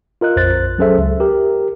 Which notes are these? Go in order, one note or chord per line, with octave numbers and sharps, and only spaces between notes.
F4 A#4 D#5 F#6
A#1 F2 C5 F#6 A6
F#3 C#4 G#4 A4 C5 E5
C#2
G4 A#4